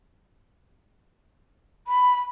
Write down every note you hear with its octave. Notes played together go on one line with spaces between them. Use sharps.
B5